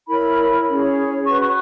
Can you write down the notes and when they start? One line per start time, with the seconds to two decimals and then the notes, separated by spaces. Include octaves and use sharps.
0.08 E4 A#4 C#5 B5
0.68 C#4 G#4 C#5
1.25 F#4 B4 C#6
1.41 C#6